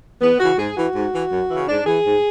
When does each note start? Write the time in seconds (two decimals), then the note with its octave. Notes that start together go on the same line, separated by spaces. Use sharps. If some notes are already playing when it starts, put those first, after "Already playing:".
0.21 E2 B3
0.39 C#3 E3 F#4
0.58 G#2 G#4
0.76 E3 F#4
0.95 G#2
1.13 E3
1.31 F#2
1.50 C#3 E3
1.68 G#2 D4
1.86 E3 G#4
2.05 G#2